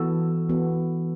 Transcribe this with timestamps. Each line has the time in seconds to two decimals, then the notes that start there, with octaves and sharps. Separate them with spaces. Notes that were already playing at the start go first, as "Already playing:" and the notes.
Already playing: E3 B3 F#4 A4
0.49 E3 B3 F#4 A4